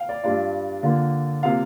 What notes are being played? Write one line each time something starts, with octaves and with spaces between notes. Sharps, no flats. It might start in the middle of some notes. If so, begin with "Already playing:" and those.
Already playing: F5 G5
D5
G2 G3 D4 F4 D5
D3 A#3 F4
C3 A#3 F4 F5